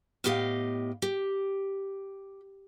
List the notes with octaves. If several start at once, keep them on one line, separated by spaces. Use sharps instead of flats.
A2 B3 G4 D#5 F5
G4